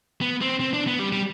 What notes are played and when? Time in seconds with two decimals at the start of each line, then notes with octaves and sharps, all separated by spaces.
0.21 B3
0.42 C4
0.60 C4
0.74 D4
0.87 B3
0.99 G3
1.12 G3